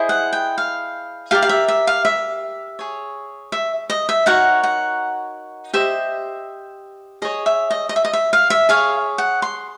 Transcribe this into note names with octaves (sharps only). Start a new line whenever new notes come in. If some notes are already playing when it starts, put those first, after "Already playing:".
Already playing: E4 G#4 C5 D#5
F#5
G5
F5
G4 A#4 D5 F5
F5
E5
E5
F5
E5
G#4 C#5
E5
D#5
E5
D#4 F#4 A#4 C#5 F#5
F#5
G4 C5 D#5 E5
G#4 C#5 D#5
E5
D#5
D#5
E5
D#5
E5
F5
E5
G#4 C#5 F5
F#5
C6